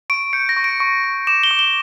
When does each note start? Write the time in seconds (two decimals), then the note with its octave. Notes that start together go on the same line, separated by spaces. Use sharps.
0.10 C#6 D7
0.33 G6 C#7
0.49 A#6
0.57 C#6
0.64 D7
0.80 C#6
1.04 C#6
1.27 D6 E7
1.44 G7
1.51 D6
1.59 G7